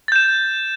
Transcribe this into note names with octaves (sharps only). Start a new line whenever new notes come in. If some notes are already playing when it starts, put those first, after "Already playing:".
G6 A6 E7